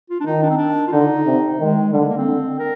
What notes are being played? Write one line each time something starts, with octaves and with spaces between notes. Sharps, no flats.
F4
D4
D#3 D#4
D4
C4
D4
F4
D3 D#4
C3
D#3 G#3
D3 G3
G#3
A#3
C4
D3
A#4